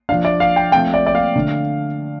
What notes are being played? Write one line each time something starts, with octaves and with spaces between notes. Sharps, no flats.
F3 D4 F5
D5
F5
G5
F3 A3 C4 G5
D5
D5
F5
D3 A3 D4